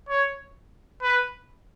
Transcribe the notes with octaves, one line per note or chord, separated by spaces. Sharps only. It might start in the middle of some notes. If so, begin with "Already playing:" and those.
C#5
B4